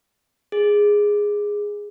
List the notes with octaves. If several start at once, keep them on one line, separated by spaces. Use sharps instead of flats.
G#4